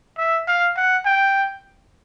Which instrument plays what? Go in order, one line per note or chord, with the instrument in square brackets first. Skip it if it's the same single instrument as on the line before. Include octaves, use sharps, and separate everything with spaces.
[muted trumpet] E5
F5
F#5
G5